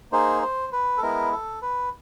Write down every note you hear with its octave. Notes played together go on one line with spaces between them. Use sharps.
A#3 D#4 G#4 C5
C5
B4
A4
G#3 B3 E4 A#4
A4
B4